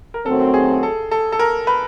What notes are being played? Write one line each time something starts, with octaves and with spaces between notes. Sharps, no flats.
A#4
F#2 D#3 F#3 A3 C4 A4
G#4
A4
A4
A4
A#4
B4